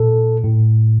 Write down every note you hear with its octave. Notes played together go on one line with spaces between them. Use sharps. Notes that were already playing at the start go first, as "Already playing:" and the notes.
Already playing: A#2 A4
A2